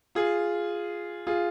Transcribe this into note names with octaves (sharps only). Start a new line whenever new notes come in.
F4 G#4
F4 G#4